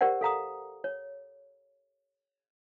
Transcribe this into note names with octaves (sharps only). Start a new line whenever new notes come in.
G4 A#4 C5 D5 F#5
A4 F5 A#5 D#6
C#5